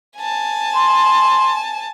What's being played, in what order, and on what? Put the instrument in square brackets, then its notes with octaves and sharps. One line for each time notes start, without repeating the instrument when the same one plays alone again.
[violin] G#5 A5
[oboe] C6